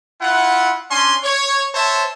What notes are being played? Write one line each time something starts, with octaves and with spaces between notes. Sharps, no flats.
E4 F4 F#5
C#4 D4 G#5 C6
C#5
C5 C#5 E5 A5